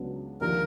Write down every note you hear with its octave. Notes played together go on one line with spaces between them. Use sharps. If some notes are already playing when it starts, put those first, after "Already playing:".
Already playing: C#2 C#3 F#3 B3 D4
D#2 D3 F3 A#4